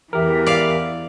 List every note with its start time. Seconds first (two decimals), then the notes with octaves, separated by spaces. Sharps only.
0.13 E2 E3 G4 A#4 E5
0.46 D5 F5